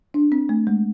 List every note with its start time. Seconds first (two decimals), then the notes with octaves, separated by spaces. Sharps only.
0.14 D4
0.32 C4
0.49 A3
0.67 G#3